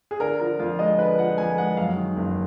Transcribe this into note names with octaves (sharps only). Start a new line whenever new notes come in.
G#4
D3 A#4
F3 A#4
F2 F4
G#3 D#5
D3 B4
F3 F#5
F2 G#5
G#3 F#5
F#2 F5
D#3
F#1